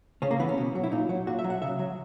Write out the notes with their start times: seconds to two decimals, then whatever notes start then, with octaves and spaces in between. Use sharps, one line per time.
0.22 C#3 C#4
0.31 A#3
0.39 E3 B3
0.49 C#4
0.58 B2
0.75 F#3
0.83 E4
0.92 A#2 D#4
1.09 F#3
1.27 A#2 F#4
1.39 E5
1.44 F#3
1.50 F#5
1.62 C#3 E5
1.79 F#3